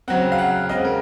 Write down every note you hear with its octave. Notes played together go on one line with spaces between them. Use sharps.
C#3 F#3 C4 F#5
F5
F#5
C#3 G#3 C4 D#5
A#4